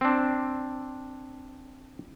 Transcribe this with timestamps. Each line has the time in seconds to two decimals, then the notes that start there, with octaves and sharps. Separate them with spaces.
0.01 C4 D4